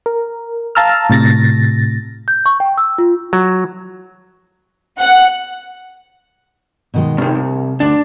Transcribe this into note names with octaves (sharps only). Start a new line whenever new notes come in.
A#4
F5 A5 A#5 E6 F6
A2 C3 A6 A#6
G6
C#6
G5
E6
F4
F#3
F#5
B2 D#3 G#3
G2 C3 D#3
C2
D2 D4